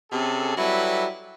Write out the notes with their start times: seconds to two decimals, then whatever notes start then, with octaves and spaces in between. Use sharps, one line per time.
0.12 C3 C#4 G#4 A4
0.57 F#3 G3 E4 A4 B4